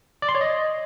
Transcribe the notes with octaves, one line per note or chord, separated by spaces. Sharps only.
D5
C6
C#5
D#5